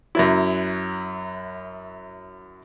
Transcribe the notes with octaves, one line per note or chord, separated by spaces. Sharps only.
F#2 F#3 E4